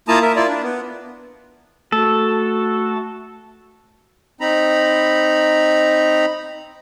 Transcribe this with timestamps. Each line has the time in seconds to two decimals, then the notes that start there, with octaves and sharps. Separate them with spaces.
0.08 A#3 E4 F4 A5 A#5 D#6
0.22 A#4 E5
0.36 E4 F4 D5
0.48 D4
0.63 B3
1.92 A3 F#4 A4
4.41 C4 D#4 A#5 B5